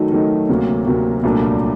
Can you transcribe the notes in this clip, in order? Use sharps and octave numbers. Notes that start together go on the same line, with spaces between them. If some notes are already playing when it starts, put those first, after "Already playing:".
Already playing: D#3 F#3 A3 D#4
D#3 F#3 A3 D#4
D2 C3 F#3 A#3
D2 C3 F#3 A#3
C2 A#2 F#3 A3 D4